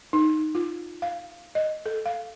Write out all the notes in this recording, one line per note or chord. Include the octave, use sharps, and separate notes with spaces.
D#4
F4
F5
D#5
A4
F5